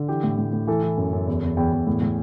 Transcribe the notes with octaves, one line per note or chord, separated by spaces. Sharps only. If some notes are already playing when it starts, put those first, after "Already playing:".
Already playing: D3
E3 G4
A2
A2
A2
E3 A4
E3
F#2
F#2
E2
E2
E2 G5
E2
A2
A2